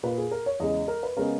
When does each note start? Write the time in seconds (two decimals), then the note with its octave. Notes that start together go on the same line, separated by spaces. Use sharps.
0.03 A#2 A#3 B4
0.18 G#4
0.31 A#4
0.46 C#5
0.60 E2 C#3 G#3 D#5
0.88 A#4
1.03 B4
1.16 C#3 G#3 B3 A#4